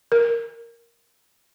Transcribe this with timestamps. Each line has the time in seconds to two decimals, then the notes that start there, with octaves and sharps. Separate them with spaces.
0.12 A#4